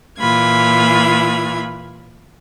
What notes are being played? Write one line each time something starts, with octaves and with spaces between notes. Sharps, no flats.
A#2 E3 F4 B5 G#6